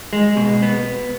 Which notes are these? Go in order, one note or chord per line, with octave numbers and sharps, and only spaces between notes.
G#3
B2
B3